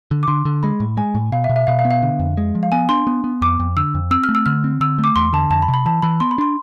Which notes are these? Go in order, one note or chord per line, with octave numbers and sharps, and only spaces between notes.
D3
D6
D3 C6
D3
G#3 B5
A2
G#3 G#5
A2
B2 F5
E5
B2
E5
B2 F5
F5
B3
F5
D3
F2
G#3
F3
F5
B3 G#5
D4 C6
B3
B3
F2 D6
F2
D3 E6
F2
C4 E6
F6
A3
E6
D3 F6
C4
D3 E6
A3
D6
E2 C6
D3 A5
F2 A5
B5
C3
B5
E3 A5
E3 B5
B3 C6
B5
D4 C6